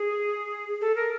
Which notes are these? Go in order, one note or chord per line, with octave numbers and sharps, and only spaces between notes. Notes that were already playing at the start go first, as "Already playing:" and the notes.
Already playing: G#4
A4
A#4